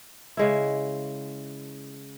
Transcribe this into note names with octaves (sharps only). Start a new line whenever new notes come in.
C#3 G#3 E4